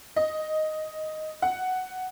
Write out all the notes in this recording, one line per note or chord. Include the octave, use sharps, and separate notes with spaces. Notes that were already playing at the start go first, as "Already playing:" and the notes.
D#5
F#5